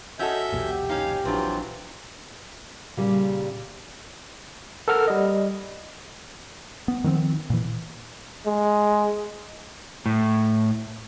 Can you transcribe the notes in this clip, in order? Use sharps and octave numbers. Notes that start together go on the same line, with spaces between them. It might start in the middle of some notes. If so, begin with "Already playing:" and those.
C#4 F#4 A4 D#5 E5 G6
B1 E2 A#2 G4
C#4 D#4 F5
A#1 E3 F#3 C4 D4 F4
A#2 C#3 G3 A#3
A4 A#4 F#5 F6
G3 D#5
B3
D#3 F3 A3 C4
A#2 E3
G#3
A2